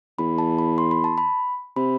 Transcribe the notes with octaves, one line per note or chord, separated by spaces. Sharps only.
E2 B5
A5
B5
C6
B5
A5
B5
C3 B5